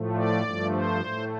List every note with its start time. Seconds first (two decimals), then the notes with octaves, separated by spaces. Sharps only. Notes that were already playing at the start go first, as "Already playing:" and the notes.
Already playing: A2 F3 A3
0.16 D5
0.44 G2 F3 A3
0.73 C5
1.01 A2 A3